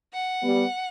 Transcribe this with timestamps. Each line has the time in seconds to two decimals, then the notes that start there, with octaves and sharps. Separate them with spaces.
0.14 F#5
0.43 G3 B3